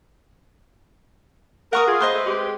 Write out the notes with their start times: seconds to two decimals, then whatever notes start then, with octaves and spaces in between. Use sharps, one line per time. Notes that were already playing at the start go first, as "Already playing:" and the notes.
1.73 A#4 F#5 C#6 D#6
1.87 F4 G#4
2.00 B4 C5 D#5
2.13 A3
2.26 G#3 C4 G4